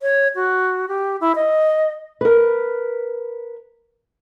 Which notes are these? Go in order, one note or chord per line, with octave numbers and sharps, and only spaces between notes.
C#5
F#4
G4
E4
D#5
A#4 B4